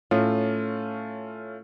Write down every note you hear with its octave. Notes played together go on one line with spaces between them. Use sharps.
A2 A3 C#4 F4